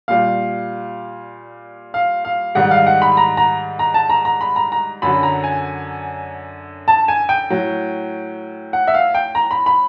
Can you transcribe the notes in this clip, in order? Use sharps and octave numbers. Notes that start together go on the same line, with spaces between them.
A#2 G3 F5
F5
F5
G#2 D#3 G3 F#5
F5
F#5
B5
A#5
A#5
A#5
A5
A#5
A#5
B5
A#5
A#5
F#2 D3 F#3 B5
A#5
G#5
A5
G#5
G5
A2 F#3
F#5
E5
F5
G5
A#5
B5
B5